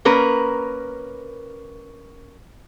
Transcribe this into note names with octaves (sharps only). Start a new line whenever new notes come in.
A#3 C#4 A#4 B4